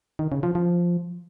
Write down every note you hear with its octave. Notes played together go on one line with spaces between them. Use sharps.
D#3
C#3
F3
F3